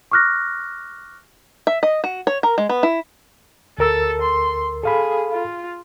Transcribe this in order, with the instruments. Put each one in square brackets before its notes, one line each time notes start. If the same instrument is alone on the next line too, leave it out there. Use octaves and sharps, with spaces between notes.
[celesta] C#6 D6 F6 F#6 A#6
[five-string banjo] E5
D#5
F#4
C#5
A#4
G#3
B3
E4
[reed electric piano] D2 A#4 E6 [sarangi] A4
[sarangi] C6
[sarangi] G#4 [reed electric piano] A4 F5 B5
[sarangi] F4